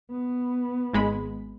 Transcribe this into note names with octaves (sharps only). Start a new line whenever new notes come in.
B3
G#1 G#3 B5